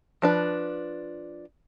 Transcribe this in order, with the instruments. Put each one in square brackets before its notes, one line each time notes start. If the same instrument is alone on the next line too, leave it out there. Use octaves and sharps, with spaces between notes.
[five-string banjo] F3 D4 B4